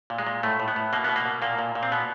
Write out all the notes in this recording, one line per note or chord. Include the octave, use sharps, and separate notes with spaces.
A#2
G#3
A#2
A2 A3
A2
B3
A2
B2 A#3
B2 B3
A#3
B2
A#2 A#3
A#2
A#2
C4
B2 B3